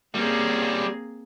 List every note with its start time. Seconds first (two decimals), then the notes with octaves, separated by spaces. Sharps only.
0.15 G3 A#3 C4 C#4 G#4